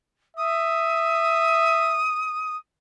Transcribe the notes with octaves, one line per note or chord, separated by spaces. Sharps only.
E5 D#6